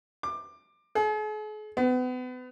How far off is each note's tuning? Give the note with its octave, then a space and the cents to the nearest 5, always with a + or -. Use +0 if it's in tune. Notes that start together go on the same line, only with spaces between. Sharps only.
D6 +20
G#4 +45
B3 +35